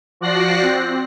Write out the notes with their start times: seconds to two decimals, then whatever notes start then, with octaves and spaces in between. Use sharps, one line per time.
0.21 F3 F#4 D5 F#6 A#6 C7
0.62 C4